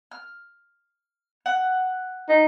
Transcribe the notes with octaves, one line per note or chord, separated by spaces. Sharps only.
F6
F#5
D#4